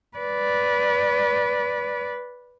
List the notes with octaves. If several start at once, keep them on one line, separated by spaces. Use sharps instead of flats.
B4 D5